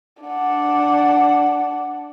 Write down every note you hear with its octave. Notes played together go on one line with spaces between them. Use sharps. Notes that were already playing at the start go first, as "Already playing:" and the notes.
D4 F#5